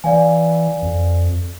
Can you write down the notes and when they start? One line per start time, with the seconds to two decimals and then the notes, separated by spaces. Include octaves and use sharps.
0.04 E3 D5 F5 G#5
0.82 F2